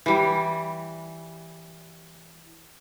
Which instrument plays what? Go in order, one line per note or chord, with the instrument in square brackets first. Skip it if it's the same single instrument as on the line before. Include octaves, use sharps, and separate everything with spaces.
[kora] E3 G3